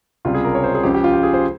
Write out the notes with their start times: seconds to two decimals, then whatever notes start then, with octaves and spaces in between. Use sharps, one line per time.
0.25 C#2 C3 G3 F4
0.34 G#4
0.44 A#4
0.55 C#5
0.64 C5
0.75 G#4
0.84 C#2 C#3 F3 G#3 G4
0.94 G4
1.04 F4
1.13 G4
1.23 G#4
1.34 C5